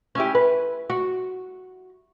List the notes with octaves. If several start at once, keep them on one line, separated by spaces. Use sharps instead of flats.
C#4 E4 G4
B4
F#4